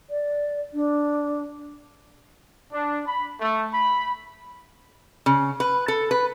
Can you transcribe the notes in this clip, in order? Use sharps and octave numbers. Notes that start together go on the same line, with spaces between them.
D5
D4
D4
B5
A3
B5
C#3
B4
A4
B4